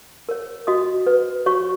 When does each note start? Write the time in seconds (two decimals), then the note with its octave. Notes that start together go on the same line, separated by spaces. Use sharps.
0.29 A#4 C#5
0.67 F#4 D#5 D#6
1.07 B4
1.46 F#4 C#5 C#6